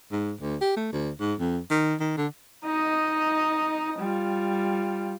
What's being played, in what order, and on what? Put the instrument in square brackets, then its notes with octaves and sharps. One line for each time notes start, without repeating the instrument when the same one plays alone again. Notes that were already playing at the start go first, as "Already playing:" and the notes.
[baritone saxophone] G#2
D2
G4
A3
D2
G#2
F2
D#3
D#3
D3
[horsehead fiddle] D#4 D#5
G3 F4